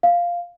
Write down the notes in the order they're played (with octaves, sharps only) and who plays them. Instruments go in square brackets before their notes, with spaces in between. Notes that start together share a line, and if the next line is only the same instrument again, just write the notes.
[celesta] F5